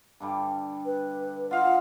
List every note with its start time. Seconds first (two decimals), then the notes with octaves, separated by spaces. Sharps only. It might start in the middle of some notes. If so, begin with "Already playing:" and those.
0.20 G2 D3 G3
0.86 B4
1.51 F4 D#5 F5 F#5